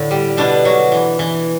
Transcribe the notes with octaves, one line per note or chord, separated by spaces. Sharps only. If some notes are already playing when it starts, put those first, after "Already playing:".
Already playing: A2 D3 E4
G3
B2 B3 D4
F#3
E3
E3